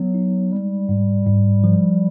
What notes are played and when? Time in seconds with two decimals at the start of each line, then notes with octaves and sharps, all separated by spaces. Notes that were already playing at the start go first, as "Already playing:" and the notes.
Already playing: F#3 B3
0.14 D#4
0.52 G3 G#3
0.89 G#2
1.26 G#2
1.64 F3